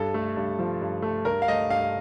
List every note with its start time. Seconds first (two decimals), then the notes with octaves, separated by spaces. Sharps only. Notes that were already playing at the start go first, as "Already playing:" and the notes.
Already playing: G2 G3 A4
0.14 A3
0.37 G2
0.59 F3
0.81 G2
1.02 A3
1.25 G2 A#4
1.42 F5
1.48 A3 D#5
1.70 G2 F5